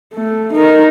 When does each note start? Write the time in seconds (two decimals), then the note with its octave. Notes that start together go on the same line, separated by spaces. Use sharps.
0.15 A3
0.52 D#4 A#4